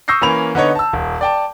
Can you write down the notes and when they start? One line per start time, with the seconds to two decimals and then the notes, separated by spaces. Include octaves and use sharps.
0.08 C#6 D#6 E6 G6 A#6 C7
0.21 E3 A#3 C#4 B5 F7
0.55 D3 B3 D#4 C#5
0.75 A5 E6
0.93 D#1
1.21 D5 G5 A5